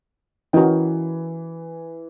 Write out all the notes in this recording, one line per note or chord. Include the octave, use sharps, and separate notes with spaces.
E3 C#4 F#4 A#4 D#5 G5